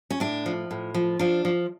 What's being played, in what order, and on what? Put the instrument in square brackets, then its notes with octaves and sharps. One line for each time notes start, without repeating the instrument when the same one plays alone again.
[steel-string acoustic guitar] C#4
A2 D4
F3
A2
F3
F3 D4
F3